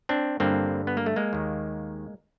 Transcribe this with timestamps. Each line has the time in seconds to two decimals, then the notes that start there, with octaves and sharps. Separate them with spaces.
0.09 C4 D4
0.40 G2 D3 A#3 C4
0.87 B3
0.97 A#3
1.06 A3
1.16 G#3 A#3
1.33 D#2 D#3